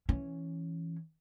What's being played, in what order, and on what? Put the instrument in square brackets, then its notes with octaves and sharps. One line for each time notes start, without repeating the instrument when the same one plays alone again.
[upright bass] E3 C#4